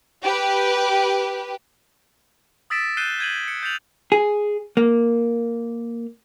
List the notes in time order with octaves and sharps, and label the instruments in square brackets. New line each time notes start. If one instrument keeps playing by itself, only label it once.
[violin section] G4 B4
[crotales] D#6 E6 A6 B6 D7 E7
F#6 G6 C7 D#7 E7 G7
G6 G#6 D#7 F#7
C#7
G6 A6 C7 F7 F#7
[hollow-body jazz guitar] G#4
A#3